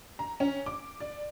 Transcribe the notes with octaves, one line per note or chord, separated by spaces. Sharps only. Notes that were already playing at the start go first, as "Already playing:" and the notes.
A#5
C#4
D6
D5